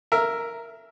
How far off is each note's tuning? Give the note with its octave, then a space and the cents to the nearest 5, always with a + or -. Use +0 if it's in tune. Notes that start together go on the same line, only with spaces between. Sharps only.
A#4 +0 E5 +10